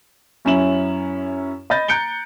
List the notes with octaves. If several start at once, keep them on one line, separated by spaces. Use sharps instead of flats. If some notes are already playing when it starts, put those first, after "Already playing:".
F#2 C#4 E4 E7 F#7
D#5 B5 G6 A6
A#5 F#6 G6 C#7 D7 G7